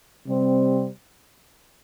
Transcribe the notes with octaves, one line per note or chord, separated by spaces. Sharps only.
C3 G3 C4